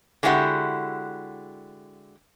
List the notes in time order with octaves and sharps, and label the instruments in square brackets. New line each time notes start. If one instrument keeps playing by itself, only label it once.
[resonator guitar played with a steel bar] D3 G#3 E4 F#4 G4 F#5